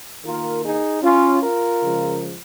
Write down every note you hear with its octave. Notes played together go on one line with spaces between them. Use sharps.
D#3 A#3 F4 A#4
D#4 G#4
C#4 F4
F4 A#4
C#3 F3 G#3